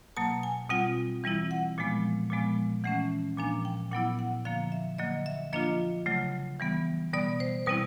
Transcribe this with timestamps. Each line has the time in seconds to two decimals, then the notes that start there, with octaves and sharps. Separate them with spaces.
0.17 B2 F#3 A#3 A5
0.43 G#5
0.69 B2 G3 C4 F4 F#5
1.24 E3 G3 C4 E4
1.51 F#5
1.78 A#2 F3 G#3 B3
2.30 A#2 F3 G#3 B3
2.84 E3 A3 C#4 F#5
3.38 A#2 F3 A#3 D4 G#5
3.65 G5
3.91 A#2 F#3 B3 E4 F#5
4.19 F#5
4.45 D3 F3 A#3 F5
4.72 E5
4.98 D3 F#3 A#3 D#5
5.26 E5
5.53 F3 A#3 D4 F4 D#5
6.06 C#3 F#3 A3
6.60 E3 G3 B3
7.13 B2 G3 B3 D5
7.40 C5
7.66 B2 G3 C4 E4 B4